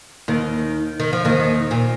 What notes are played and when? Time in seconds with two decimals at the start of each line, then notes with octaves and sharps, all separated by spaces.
0.28 D#2 D#3
1.00 D#3
1.13 F3
1.25 D#2 D#3
1.71 A#2